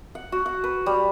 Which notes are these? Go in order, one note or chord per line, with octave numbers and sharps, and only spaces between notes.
F#5
F#4
F#5
B4
G3